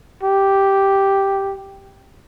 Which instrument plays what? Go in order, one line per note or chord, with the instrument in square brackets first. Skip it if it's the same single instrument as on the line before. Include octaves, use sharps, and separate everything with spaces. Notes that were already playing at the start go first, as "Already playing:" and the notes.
[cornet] G4